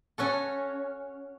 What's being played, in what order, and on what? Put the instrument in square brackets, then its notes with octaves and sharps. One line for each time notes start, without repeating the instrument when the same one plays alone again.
[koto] C#4 F#4 A4